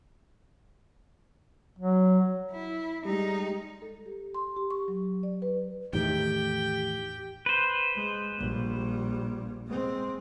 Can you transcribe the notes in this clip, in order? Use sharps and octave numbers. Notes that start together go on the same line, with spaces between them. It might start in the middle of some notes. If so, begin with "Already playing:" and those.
F#3
E4
G3 G#3 D#4
A4
G4
C6
G4
C#6
F#3
D5
B4
E2 A2 D#3 G4 G5
B4 C5
G#3
A#1 G3
G#3 C4